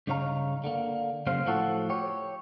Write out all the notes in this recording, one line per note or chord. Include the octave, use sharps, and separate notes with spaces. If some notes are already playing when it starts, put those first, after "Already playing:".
G2 C#3 D#4 C#5 F5 A#5
D3 A#3
F#2 C#3 A#3 C#4 C5 F5
A2 F3 F#4 A4
G4 C#5